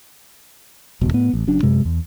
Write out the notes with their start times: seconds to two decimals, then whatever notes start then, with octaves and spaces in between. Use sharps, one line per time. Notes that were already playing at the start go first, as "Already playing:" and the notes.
1.01 D#1 C2 B2
1.13 A2 B3
1.33 A1
1.47 F#1 F#2 D4
1.63 F#2 C3 G#3
1.85 E2